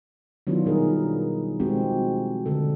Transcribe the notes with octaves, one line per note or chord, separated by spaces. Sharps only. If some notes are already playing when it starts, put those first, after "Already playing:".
D#3 F#3 B3 D4 E4 F4
B2 G3 D#4 G#4 A#4
B2 F3 G#3 C4 F#4 G4
D3 G#3 A4